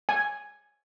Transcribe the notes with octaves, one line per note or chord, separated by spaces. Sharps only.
G#5